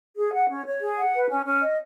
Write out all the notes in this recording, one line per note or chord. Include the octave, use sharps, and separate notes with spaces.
G#4
F#5
C#4
C#5
G#4
F#5
B4
C#4
C#4
D#5